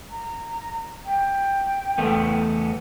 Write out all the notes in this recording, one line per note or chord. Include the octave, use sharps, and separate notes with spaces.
A#5
G5
E2 A3 B3